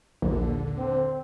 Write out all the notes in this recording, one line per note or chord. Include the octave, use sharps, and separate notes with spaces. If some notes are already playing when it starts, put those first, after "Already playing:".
A#1 D#2 D3
C4